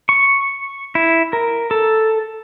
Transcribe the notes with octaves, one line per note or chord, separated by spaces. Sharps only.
C#6
E4
A#4
A4